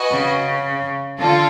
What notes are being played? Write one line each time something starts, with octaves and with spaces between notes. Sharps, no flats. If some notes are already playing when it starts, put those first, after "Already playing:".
Already playing: F#4 B4 D#5 G#5
C#3
D3 F4 A4